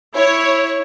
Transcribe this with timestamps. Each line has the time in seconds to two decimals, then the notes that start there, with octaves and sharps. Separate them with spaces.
0.14 E4 C#5